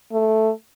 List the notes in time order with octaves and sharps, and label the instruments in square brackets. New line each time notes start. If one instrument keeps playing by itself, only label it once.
[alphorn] A3